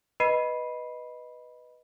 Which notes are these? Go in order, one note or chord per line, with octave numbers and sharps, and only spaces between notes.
B4 D#5 B5 C7 D#7